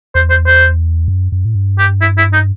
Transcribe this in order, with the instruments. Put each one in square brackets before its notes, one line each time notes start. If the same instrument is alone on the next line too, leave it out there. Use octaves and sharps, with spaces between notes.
[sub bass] E2 [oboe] C5
[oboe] C5
C5
[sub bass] F#2
F#2
A2
G2
[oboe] G4
E4
E4
D#4